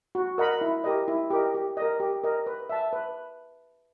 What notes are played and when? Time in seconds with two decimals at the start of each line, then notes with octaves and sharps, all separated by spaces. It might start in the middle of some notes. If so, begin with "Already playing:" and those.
0.15 F#4
0.38 A#4 D#5 F#5 B5
0.61 E4
0.84 G4 A#4 D#5
1.08 E4
1.30 G4 A#4 D#5
1.54 G4
1.77 A#4 D#5
2.00 G4
2.24 A#4 D#5
2.46 B4
2.69 E5 A5
2.93 B4